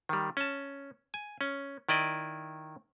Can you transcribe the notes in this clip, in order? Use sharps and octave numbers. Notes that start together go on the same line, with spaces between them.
D#3 G3
C#4 A5
G#5
C#4
D#3 E4 D5 D#5